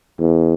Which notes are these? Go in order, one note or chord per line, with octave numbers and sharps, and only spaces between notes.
E2